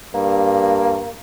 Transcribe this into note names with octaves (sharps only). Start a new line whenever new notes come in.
G2 A#3